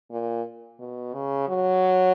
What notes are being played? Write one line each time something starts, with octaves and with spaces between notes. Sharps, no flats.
A#2
B2
C#3
F#3